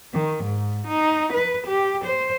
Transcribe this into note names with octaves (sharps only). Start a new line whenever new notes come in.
D#3
G#2
D#4
B4
G4
C5